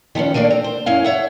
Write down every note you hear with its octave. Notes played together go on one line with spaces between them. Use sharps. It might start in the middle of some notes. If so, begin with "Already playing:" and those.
D#3 F3 B3 C#4
A3 A#3 D4 B4 D5
C4
C5
F#2 C#4 E4 F5
C#5 E5 F#5